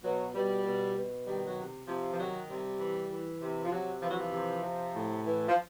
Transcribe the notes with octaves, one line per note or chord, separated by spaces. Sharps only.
B2 F#3
B2 G3
B2
B2
D#3 G3
F#3
C3
C3 F3
F3
D#3 F#3
C3 G3
E3
E3
C3
F3
C3 F#3
E3 F3
F#3
F3
C3
C3
A2
E3
F3